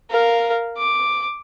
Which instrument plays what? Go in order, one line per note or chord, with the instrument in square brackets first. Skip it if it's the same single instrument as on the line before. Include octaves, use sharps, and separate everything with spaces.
[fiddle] A#4 F5
D6